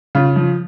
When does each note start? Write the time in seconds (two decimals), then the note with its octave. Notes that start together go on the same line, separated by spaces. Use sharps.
0.15 C#3 F4
0.36 F3